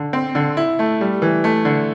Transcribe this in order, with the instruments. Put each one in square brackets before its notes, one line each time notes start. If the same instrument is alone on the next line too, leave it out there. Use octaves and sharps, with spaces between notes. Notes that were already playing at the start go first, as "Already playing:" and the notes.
Already playing: [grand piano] D3
C4
D3
E4
A3
G3
E3
A3
D3